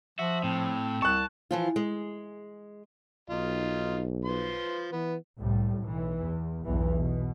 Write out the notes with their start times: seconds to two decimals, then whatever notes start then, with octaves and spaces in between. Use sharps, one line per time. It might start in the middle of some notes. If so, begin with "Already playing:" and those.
0.19 F3 F#4 E5
0.44 A2 C4
1.02 C2 A5 C#6 F#6
1.51 E3 F3 F4
1.76 G#3
3.30 B1 D#4 F4
4.25 F3 B4 C6
4.92 E3 B3
5.39 C2 A2 G3
5.82 B1 E3
6.22 E2
6.64 B1 E2 G2 E3
6.97 B2